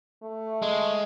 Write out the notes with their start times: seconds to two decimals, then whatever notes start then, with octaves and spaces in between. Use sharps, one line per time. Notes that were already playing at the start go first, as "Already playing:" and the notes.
0.23 A3
0.62 G#3